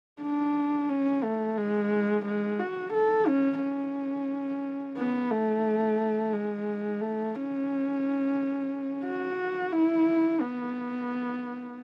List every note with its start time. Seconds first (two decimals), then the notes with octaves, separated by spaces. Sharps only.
0.22 D4
0.89 C#4
1.23 A3
1.58 G#3
2.25 G#3
2.60 F#4
2.93 A4
3.28 C#4
3.61 C#4
4.97 B3
5.31 A3
6.33 G#3
7.01 A3
7.35 C#4
9.05 F#4
9.73 E4
10.40 B3